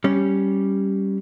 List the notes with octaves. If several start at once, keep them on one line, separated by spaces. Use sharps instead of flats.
G3 C#4